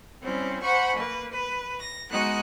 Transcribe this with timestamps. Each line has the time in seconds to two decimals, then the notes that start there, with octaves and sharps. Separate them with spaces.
0.22 G3 C4 C#4 E4
0.62 C5 F#5 G#5 B5 C#6
0.95 A#3 B4
1.31 B4
1.80 A#6
2.10 G#3 B3 D#4 F#4 F#6